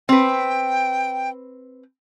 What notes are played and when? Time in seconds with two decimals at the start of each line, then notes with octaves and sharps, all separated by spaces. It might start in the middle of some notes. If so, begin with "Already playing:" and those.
0.09 C4 B4 G5